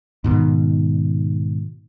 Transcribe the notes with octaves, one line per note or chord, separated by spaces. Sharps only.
G#2 B2 D#3